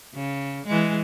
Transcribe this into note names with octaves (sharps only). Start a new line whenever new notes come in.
C#3
E3 G#3